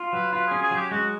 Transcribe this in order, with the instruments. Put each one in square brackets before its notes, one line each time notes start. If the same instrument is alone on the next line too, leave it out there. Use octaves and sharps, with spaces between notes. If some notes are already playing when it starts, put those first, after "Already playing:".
Already playing: [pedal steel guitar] F4
[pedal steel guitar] F#3 [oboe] B4
[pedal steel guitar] F4 [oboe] B4
[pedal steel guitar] C#4 [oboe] G#4
[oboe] G#4
[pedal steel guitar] F#3
[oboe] G4
[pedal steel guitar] G#3 [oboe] F#4